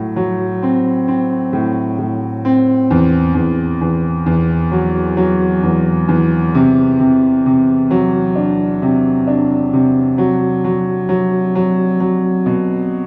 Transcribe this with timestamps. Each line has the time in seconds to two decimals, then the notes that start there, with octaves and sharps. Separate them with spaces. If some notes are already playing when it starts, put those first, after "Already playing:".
Already playing: A2 F#3
0.16 F#3
0.63 C4
1.08 C4
1.53 A2
1.99 A2
2.45 C4
2.91 E2
3.35 E2
3.81 E2
4.26 E2
4.72 F#3
5.17 F#3
5.63 E2
6.09 E2
6.55 C3
6.99 C3
7.46 C3
7.91 F#3
8.36 D4
8.82 C3
9.27 D4
9.73 C3
10.18 F#3
10.65 F#3
11.09 F#3
11.55 F#3
12.00 F#3
12.46 B2